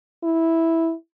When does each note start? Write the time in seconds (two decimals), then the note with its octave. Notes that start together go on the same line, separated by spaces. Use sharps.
0.24 E4